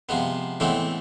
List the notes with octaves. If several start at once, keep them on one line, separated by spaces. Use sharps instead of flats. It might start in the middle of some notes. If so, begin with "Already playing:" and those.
C3 F3 G#3 B3
A2 E3 G#3 B3 C4